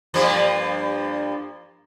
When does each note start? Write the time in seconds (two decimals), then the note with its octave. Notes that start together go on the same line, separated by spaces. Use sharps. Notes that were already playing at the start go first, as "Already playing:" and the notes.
0.14 G2 F3 A#3